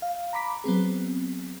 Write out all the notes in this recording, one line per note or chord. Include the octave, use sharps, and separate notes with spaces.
F5
A#5 B5 D6 B6
F#3 B3 C4 G#4